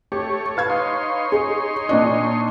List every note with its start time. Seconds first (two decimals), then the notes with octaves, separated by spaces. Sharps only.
0.12 A3 G4 C#5
0.57 B4 F5 A5 G#6
0.70 D#4 C#5 C6
1.32 G#4
1.89 A#2 D4 D#5